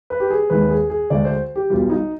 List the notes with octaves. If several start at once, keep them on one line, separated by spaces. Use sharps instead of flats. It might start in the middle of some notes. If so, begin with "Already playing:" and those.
B4
G4
G#4
D#2 D#3 G#3 B4
G#4
G#4
D2 D3 G#3 D5
C5
G4
B1 B2 G3 F4
D#4